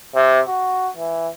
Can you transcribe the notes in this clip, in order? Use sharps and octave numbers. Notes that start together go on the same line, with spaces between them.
C3
F#4
E3